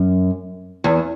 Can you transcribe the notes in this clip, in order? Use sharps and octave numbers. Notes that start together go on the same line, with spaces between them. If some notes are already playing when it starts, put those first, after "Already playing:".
Already playing: F#2
E2